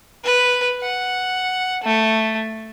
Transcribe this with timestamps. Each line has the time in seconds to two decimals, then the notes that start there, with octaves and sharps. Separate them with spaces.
0.24 B4
0.81 F#5
1.84 A3